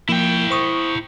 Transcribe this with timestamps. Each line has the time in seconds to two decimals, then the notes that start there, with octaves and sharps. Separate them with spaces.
0.09 F3 A#3 E4 G5
0.50 C5 C#6 D#6